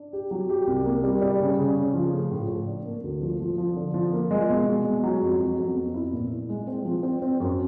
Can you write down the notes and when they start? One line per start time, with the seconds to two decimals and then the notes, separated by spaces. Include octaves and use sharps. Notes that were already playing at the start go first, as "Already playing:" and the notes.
Already playing: D4
0.13 G4
0.31 F#3
0.50 G4
0.67 C2
0.86 A#3
1.04 G3
1.21 G3
1.40 C#3
1.59 C#3
1.77 C#3
1.94 F3
2.13 A3
2.31 A2
2.49 A2
2.67 D4
2.86 A#3
3.04 D2
3.21 F3
3.40 F3
3.58 F3
3.76 D3
3.94 F3
4.13 A#3
4.31 G#3
4.49 B2
4.67 G#3
4.85 G#3
5.04 F#3
5.21 F2
5.40 F#3
5.58 F2
5.76 B3
5.94 E4
6.13 A#2
6.30 E4
6.49 G#3
6.67 C4
6.85 F3
7.03 C4
7.22 C4
7.40 F#2